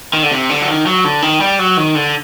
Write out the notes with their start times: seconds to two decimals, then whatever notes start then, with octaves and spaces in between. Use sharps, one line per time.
0.13 D#3
0.23 D3
0.31 C3
0.49 D3
0.61 F#3
0.68 D#3
0.86 F#3
1.04 D3
1.22 D#3
1.41 G3
1.59 F#3
1.77 D#3
1.95 D3